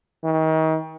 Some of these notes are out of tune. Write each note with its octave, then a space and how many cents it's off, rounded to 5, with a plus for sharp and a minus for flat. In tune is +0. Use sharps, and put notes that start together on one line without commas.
D#3 +35